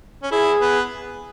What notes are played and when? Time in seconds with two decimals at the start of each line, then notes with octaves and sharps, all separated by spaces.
0.23 C#4
0.31 E4 G#4
0.61 B3